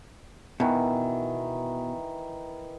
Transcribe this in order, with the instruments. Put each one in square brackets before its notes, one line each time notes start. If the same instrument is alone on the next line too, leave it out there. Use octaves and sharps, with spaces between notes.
[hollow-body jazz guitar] B2 [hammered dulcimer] D#3 E3